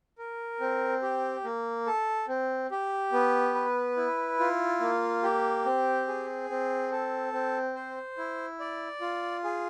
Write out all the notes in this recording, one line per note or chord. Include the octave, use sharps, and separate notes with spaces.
A#4
C4
G4
A#3
A4
C4
G4
B3
B4
E4
F4
A#3
G4
C4
G#4
C4
A4
C4
C5
E4
D5
F4
G#4